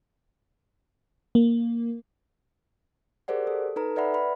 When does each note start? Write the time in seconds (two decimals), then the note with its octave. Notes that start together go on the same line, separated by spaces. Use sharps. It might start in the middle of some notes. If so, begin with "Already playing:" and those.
1.35 A#3
3.28 G4 G#4 A#4 C5 D5 F#5
3.47 A4
3.76 D#4 A4 B4 A#5
3.96 B4 D5 E5 F#5 B5
4.14 B4 B5